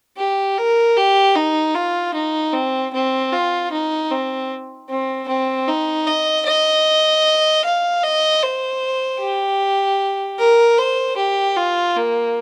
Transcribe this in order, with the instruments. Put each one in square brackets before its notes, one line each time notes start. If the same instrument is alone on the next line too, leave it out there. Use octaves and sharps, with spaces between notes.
[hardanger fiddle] G4
A#4
G4
D#4
F4
D#4
C4
C4
F4
D#4
C4
C4
C4
D#4
D#5
D#5
F5
D#5
C5
G4
A#4
C5
G4
F4
A#3